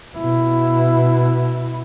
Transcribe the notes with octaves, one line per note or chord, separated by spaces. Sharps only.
B2 E4